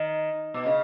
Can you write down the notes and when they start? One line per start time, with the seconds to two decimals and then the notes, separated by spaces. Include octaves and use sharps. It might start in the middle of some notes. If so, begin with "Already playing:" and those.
Already playing: D#3
0.54 B2
0.65 C#3